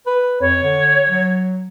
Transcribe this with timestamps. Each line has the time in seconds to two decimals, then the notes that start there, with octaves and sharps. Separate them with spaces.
0.07 B4
0.40 F2 C#5
0.63 D3
1.09 F#3